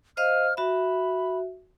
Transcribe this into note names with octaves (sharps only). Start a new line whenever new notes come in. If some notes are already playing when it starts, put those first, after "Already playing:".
C5 D#5 F5 F6
F#4 E5 B5